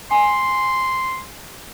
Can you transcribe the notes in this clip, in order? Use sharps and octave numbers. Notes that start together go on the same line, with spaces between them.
G#5 C6